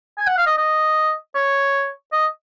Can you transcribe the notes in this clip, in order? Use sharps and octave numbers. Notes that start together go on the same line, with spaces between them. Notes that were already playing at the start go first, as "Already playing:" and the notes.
G#5
F#5
F5
D#5
D#5
C#5
D#5